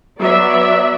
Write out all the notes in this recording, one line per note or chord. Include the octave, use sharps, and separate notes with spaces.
F#3 B3 D5 E5